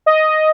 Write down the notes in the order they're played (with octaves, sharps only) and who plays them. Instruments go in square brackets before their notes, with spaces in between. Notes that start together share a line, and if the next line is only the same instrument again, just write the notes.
[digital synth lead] D#5